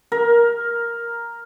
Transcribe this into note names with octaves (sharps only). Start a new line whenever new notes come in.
A#4